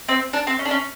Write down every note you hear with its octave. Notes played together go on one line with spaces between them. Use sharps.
C4
D4
C4
C#4
D4
C#4